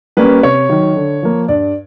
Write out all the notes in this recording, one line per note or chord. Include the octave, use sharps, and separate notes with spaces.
G3 A#3 C#4 B4
C3 C#5
D#3 F#3
D3
F3 A#3
G2 D5